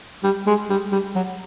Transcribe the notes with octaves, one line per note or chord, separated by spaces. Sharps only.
G3
G#3
G3
G3
F#3